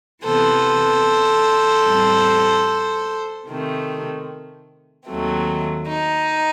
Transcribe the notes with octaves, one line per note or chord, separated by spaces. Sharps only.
C3 E3 B3 A4 C5
A2 G3 C4
C3 D#3 A3 C4
D#2 D#3 F#3 A3 C4
D#4